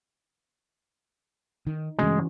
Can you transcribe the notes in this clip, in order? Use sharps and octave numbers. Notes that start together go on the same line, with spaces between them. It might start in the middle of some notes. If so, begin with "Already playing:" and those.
D#3 D#4
G2 C#3 E3 G#3 A3 C#4 F#4